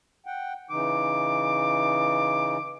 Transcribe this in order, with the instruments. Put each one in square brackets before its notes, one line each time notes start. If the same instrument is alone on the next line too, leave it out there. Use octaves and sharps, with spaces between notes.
[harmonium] F#5 G5
[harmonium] C#3 E3 D#4 [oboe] D6